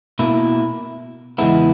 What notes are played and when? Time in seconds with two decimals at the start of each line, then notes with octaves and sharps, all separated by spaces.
0.19 B2 A#3 E4
1.38 E2 C#3 G#3 B3 E4